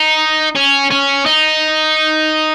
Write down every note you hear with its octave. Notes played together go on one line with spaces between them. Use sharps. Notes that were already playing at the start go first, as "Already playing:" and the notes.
Already playing: D#4
C#4
C#4
D#4